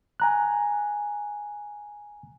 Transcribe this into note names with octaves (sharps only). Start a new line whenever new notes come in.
G#5 A#5 F#6